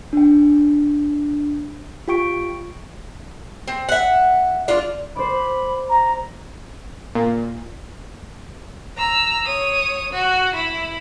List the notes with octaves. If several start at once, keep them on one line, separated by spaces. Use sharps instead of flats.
D4 G5
F4 G4 G5 C#6 D7
C4
E5 F#5
D4 F4
C5 D5 B5
A#5
A#2
A#5 E6
C#5 D#6
F#4
E4